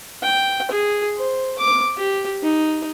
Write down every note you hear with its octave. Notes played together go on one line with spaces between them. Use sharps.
G5
G#4
C5
D6
G4
D#4